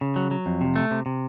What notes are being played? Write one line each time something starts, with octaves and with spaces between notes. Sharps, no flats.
C#3
F#3
F#3
F2
C3
A3
C3
C3